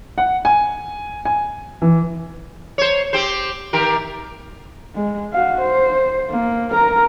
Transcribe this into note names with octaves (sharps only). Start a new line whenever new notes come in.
F#5
G#5
G#5
E3
C5 C#5
C4 G4 C5
D#3 G4 A#4
G#3
F#4 F5
C5
A#3
A#4 A#5